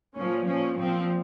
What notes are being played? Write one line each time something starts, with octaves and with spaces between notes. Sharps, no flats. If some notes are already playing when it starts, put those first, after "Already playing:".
A#2 F3 C#4
A#2 F3 C#4
A#2 F3 C4